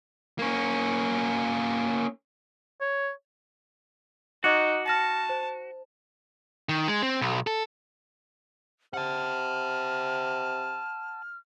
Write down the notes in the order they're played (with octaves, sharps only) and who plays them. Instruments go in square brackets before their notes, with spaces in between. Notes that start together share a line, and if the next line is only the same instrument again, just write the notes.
[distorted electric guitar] A#3 C#4
[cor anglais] C#5
[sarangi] D#4 [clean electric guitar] F#4 [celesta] D#5 D6 F#6
[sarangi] A5 [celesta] F6 A#6 C#7
[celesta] C5
[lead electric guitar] D#3
G#3
C4
B1
A4
[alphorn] C3 [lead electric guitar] F#5 A5 [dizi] F6